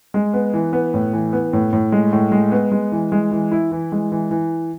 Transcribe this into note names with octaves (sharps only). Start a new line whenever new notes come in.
G#3
B3
E3
B3
A2
E3
B3
A2
A2
G#3
A2
G#3
B3
G#3
E3
G#3
E3
E4
E3
G#3
E3
E3